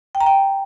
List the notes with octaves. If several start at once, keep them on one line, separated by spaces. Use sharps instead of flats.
G5
A#5
G5